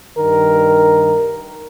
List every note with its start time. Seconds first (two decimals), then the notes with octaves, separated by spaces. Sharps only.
0.17 G2 D#3 A#4